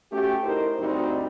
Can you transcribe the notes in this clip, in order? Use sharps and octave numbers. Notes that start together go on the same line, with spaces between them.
A3 C#4 F#4 G4
D#4 E4 A#4 C5
D2 G2 G3 C4 D#4 F#4